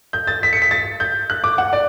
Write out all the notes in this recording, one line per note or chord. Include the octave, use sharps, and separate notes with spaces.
G6
A6
B6
C#7
B6
A6
G6
F#6
D6
F#5
D5